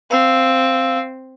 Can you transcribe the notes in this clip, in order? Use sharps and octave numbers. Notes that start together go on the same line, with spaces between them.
C4 F5 E6